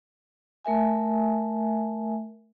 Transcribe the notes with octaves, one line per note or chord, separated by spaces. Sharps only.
A3 A#4 E5 G#5